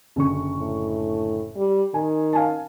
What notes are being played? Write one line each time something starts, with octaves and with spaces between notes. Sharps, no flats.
F#1 D3 C#6
A2
G3
D#3 G#5
F5 G#5 A5